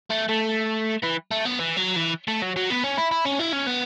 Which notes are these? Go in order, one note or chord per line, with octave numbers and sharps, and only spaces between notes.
A3
A3
E3
A3
B3
E3
F#3
E3
A3
F#3
F#3
B3
C#4
E4
E4
C#4
E4
C#4
B3